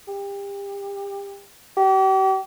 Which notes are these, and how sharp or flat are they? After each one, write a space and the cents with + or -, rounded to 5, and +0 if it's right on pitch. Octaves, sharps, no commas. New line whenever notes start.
G4 +30
G4 -40